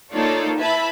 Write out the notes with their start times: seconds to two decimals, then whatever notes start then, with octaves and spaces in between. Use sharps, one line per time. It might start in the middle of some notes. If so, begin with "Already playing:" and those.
0.13 A#3 D#4 F4 A4 C#5 D5
0.60 E4 B4 E5 A5 B5